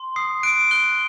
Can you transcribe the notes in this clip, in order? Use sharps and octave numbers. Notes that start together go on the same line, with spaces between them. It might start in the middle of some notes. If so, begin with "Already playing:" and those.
Already playing: C6
D#6 C7
F#6 D7
F#6 G7